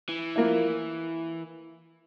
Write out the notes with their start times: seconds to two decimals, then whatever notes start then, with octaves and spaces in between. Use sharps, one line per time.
0.09 E3
0.36 F3 A#3 E4